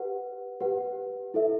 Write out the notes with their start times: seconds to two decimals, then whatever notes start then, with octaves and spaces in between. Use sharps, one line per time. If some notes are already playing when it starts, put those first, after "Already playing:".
Already playing: G4 B4 F#5
0.60 G4 B4 F#5
1.34 E4 A4 E5